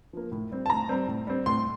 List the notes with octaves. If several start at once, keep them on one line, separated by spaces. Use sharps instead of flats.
F3 A#3
A2
G3 C4
A5
A2 A#5
G3 C4
A2
G3 C4
A2 C6